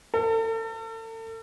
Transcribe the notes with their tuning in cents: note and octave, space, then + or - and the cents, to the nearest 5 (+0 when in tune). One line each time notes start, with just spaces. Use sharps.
A4 +40